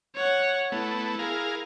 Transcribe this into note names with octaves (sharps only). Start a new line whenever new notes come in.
C#5 F#5
A3 B3 E4
G#4 A#4 F5